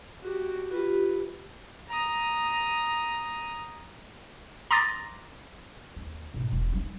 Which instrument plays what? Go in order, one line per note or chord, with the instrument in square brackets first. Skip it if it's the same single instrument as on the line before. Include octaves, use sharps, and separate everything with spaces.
[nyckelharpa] F#4 G4
[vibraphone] F4 G4 [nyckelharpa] B4
[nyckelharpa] A#5 D#6
[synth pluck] A#5 C6 D6 D#6 A6 A#6
[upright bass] D#2
G#2 B2
E1
G3 D#4